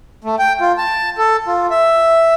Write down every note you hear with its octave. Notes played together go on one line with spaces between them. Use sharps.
A3
G5
F4
A5
A4
F4
E5